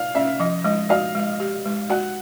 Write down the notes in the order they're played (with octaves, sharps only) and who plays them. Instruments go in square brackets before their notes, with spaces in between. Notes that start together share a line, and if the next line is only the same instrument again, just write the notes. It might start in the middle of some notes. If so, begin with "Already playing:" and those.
Already playing: [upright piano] F5
[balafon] C#4 [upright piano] E5
[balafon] F3 [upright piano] D#5
[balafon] G#3 [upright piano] D#5
[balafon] F#4 [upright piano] F5
[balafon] G#3
G4
G#3
[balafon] F#4 [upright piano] F#5